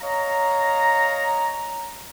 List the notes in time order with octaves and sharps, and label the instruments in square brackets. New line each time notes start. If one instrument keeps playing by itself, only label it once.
[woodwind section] C#5 D#5 F5 A#5